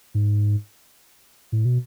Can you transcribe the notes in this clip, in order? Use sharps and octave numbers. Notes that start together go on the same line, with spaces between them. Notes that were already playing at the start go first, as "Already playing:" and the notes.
G#2
A2
B2